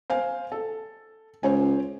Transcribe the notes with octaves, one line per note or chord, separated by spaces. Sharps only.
C5 F5 G#5
A4
C#2 C5 C#5 G#5